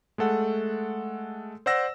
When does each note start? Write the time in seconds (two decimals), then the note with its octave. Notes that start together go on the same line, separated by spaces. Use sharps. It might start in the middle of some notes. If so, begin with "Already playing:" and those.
0.18 G#3 A3 A4 F#5
1.66 C5 D5 F#5 E6 A#6